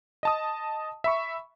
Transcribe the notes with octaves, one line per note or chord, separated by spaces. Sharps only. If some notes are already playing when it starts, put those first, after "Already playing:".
D#5 A5 D#6
E5 B5 C#6